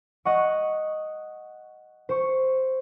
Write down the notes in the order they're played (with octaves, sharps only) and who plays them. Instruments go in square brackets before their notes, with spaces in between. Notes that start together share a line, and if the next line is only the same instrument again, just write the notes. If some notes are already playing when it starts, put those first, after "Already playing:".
[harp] D#5 F#5 C#6
C5 C#6